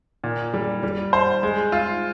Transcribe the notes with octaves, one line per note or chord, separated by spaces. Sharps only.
A#2
G3
G3
C5
G#3
F4